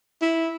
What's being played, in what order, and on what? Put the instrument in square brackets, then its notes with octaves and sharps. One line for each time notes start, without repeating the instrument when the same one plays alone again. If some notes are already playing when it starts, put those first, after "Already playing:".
[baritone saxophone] E4